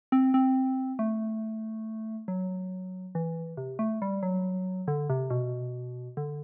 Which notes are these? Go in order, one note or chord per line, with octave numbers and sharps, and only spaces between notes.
C4
C4
A3
F#3
E3
C3
A3
G3
F#3
D3
C3
B2
D3